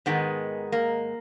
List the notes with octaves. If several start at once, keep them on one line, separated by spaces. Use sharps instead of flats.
G#2 D#3 G#3 B3
A#3